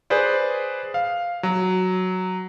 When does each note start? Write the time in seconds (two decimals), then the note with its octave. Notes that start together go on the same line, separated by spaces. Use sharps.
0.10 G#4 B4 C5 D5
0.94 F5
1.43 F#3